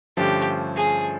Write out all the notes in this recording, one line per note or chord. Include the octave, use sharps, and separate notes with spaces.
G2 D3 F3 A3 C#4 G4
G#4